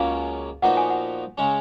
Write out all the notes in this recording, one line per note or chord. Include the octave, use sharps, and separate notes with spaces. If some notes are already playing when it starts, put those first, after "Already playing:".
Already playing: C#2 B2 A#3 C#4 F5
A#2 F3 B3 D#4 F#4 F#5
G#5
F#5
C#3 G#3 C#4